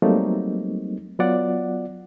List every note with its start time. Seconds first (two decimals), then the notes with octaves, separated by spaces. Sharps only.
0.02 F#3 G3 A3 A#3 C4 D#4
1.19 F#3 B3 F4 D5 F#5